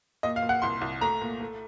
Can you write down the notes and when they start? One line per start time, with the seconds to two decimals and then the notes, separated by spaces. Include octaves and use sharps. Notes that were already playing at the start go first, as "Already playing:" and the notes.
0.23 A#2 D#5
0.36 F5
0.42 A#2
0.49 F#5
0.62 C2 C6
0.81 C2
1.01 A3 A#5
1.21 A#2
1.40 A3